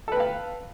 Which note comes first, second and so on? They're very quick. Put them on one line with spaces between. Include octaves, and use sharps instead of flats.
A4 B4 G5 F5